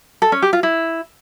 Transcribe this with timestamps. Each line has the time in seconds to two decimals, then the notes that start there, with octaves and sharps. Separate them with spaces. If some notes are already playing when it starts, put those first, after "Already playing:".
0.22 A4
0.32 C#4
0.42 G4
0.53 F4
0.63 E4